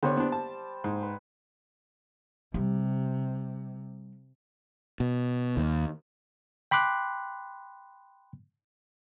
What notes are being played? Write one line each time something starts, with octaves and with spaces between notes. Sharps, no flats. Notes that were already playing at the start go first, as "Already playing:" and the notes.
D3 G3 B3 C5 C#5
B3 D4
A5
G#2
B4
C3 G3
B2
D#2
G5 B5 C6 D6 F#6